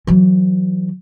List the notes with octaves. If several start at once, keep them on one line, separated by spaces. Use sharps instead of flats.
E3 F#3